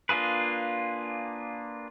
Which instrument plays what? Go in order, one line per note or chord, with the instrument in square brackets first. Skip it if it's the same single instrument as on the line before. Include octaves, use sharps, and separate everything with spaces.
[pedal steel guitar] A#3 D4 F4 G#4 B4